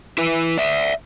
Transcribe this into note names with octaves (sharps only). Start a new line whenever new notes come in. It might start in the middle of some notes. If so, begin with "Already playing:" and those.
E4 B4
D5 E5